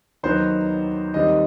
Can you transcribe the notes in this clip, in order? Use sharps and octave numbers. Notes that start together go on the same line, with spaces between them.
D#2 D#3 F#3 B3 C5
D#2 D#3 G3 C4 D#5